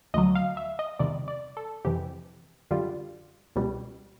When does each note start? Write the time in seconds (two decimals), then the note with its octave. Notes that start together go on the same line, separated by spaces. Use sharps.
0.14 D2 D3 F#3 D#5
0.35 F5
0.57 E5
0.79 D#5
0.99 E2 C3 D#3 G3 D5
1.28 D5
1.57 A4
1.85 F2 C3 E3 G4
2.71 F#2 D3 G3 F4
3.56 C#2 B2 G3